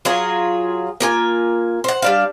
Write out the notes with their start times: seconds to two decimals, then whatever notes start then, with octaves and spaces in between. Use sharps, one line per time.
0.05 F#3 F4 G#4
1.00 A#3 F4 G#5
1.84 C5 F#5
2.02 G3 D4 F5